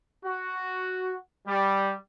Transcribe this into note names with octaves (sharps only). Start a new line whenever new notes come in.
F#4
G3